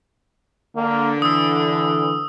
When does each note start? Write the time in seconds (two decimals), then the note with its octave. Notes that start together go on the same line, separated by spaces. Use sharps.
0.76 D3 A#3
1.22 E3 D#6 E6